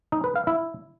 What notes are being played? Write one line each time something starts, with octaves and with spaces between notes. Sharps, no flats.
D#4
B4
F5
E4